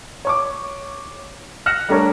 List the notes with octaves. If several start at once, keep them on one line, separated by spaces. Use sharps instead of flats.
C#5 C#6 D6
F6 F#6 A#6 C#7 E7
G3 A3 D4 A4 A#4 C#5